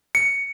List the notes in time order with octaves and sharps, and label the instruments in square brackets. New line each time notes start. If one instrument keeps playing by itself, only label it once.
[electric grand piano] C#7